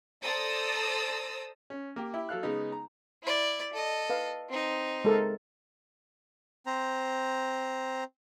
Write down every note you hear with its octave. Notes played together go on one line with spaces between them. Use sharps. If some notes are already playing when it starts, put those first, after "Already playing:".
A4 C5 D5 A#5 D#6 E6
C#4
A#3 G4
E4 G4
F#3 A4 F5 F#6
C#3 G#3 B3 D#4
A#5
E4 D5
A4 D#5
B4 F5
C4 D#4
G#3 A4 A#4
C4 C5 A#5